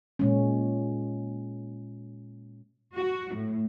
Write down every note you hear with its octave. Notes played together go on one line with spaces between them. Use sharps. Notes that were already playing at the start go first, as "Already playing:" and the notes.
A#2 G#3 C#4
F#4
A2